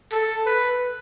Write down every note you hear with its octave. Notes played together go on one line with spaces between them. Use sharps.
A4
B4